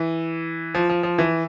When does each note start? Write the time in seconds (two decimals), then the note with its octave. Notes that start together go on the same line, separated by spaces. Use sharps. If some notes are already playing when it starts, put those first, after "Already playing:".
Already playing: E3
0.75 F3
0.89 F3
1.03 F3
1.18 E3